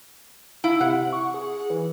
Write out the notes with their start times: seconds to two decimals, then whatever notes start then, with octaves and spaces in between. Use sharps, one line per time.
0.64 E4 F5
0.81 C3 F#5
1.13 C#6
1.34 G#4
1.70 E3